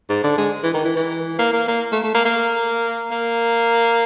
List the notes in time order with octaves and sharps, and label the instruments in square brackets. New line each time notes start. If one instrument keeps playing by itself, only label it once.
[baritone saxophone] G#2
D3
G#3
E3
D#3
E3
E3
A#3
A#3
A#3
A3
A3
A#3
A#3
A#3